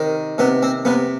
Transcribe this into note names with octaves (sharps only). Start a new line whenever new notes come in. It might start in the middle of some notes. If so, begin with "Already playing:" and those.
Already playing: C3 D#3
C3 B3
C4
C3 B3